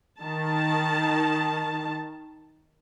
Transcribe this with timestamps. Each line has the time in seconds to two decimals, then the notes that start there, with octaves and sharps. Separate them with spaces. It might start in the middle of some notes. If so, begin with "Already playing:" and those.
0.21 D#3 A5